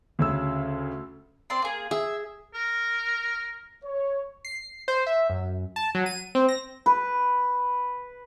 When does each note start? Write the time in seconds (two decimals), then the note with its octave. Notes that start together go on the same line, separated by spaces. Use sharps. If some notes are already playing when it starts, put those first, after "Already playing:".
0.19 D2 C#3 E6
1.50 C4 D5 C6
1.62 A#3 G#4
1.91 G#4 E5
2.54 A#4
3.83 C#5
4.45 C7
4.88 C5
5.07 E5
5.30 F#2
5.76 A5
5.95 F#3
6.06 D#7
6.35 C4
6.49 A#6
6.86 B4